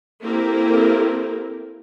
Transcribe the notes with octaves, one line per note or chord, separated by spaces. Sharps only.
A#3 C4 E4 G4 A4 A#4